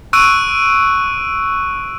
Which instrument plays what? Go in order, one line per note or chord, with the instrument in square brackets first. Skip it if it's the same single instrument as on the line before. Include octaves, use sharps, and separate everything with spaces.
[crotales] C#6 E6 F#6 D7 D#7